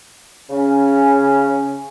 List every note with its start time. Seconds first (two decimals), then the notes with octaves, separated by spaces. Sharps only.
0.50 C#3 C#4